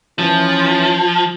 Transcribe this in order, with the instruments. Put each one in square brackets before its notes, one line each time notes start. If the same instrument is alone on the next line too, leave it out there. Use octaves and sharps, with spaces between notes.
[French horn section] E3 C#4 [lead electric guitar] F3